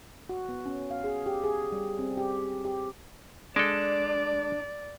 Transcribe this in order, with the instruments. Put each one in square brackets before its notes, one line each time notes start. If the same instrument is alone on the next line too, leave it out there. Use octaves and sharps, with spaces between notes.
[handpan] F#4
B3
C#4
F5
G#4
G4
G#4
G3
C4
G4
G4
[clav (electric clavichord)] G#3 A4 [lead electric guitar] D4 [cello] D5